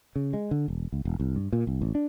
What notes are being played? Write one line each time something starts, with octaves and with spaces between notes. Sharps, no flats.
C#3
G#3
D3
E1
C#2
E1
C2
G2
A#2
C2
A1
D4